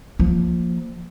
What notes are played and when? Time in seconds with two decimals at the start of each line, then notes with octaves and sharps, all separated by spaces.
0.19 F3 A#3